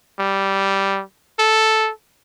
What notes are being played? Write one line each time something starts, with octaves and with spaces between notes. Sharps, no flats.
G3
A4